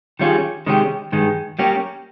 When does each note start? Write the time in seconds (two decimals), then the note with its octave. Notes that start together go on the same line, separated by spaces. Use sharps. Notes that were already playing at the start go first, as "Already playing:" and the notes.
0.19 D#3 G3 C#4 F4 G#4
0.66 C3 D#3 G#3 C#4 G4
1.12 G2 D#3 G#3
1.59 G3 A#3 C#4 G4